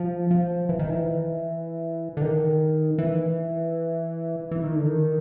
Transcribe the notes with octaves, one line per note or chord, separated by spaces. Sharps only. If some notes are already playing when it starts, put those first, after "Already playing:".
Already playing: F3
F3
E3
D#3
E3
D3
D#3
E3
E3
D#3
D3
D#3